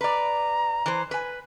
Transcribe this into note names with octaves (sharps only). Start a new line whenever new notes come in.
B4 D5 A#5
E3 C5
B4 G#5